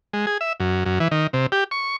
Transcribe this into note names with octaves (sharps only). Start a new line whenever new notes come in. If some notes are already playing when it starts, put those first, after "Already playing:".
G#3
G#4
E5
F#2
F#2
E3
D#3
C3
G4
C#6